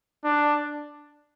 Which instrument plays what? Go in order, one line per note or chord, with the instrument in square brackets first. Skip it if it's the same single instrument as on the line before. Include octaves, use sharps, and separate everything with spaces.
[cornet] D4